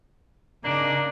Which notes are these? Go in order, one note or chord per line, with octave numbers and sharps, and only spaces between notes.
C#3 A#3 D4 D#4